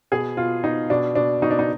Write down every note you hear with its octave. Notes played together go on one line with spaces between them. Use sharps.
B2 G#4
B2 F4
B2 D#4
B2 D4
B2 D4
B2 D#4
D4
D#4